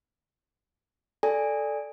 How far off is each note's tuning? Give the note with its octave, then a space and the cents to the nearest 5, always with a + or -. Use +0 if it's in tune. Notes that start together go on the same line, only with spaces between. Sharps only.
A4 +0 D5 +0 G#5 -20